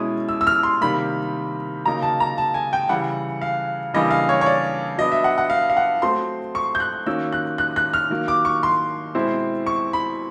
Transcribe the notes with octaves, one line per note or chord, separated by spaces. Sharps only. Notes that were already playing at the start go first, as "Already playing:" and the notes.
Already playing: B2 G#3 C#4 E4 D#6
E6
E6
F6
C6
C3 D#3 G3 A#3 B5
C#3 F#3 A#3 D#4 A#5
A5
A#5
A5
G#5
G5
C#3 E3 G3 F#5
F5
C#3 E3 G3 A#3 D4 D#5
F5
C#5
C#5
D5
F#3 B3 D4 D#5
E5
F#5
F#5
F5
F5
F#5
F#3 A3 C4 C6
C#6
G6
F#6
D#3 F#3 A#3 C#4 E6
F#6
F#6
F#6
F6
D#3 F#3 A#3
D6
C#6
C6
B2 G#3 C4 E4
C#6
B5